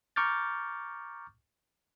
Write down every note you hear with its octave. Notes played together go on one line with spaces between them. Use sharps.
A#5 C#6 D6 F6 G6 A6